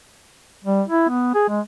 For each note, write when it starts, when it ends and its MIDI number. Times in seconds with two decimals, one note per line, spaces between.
0.64 0.82 55
0.88 1.09 64
1.09 1.33 59
1.35 1.46 68
1.48 1.60 56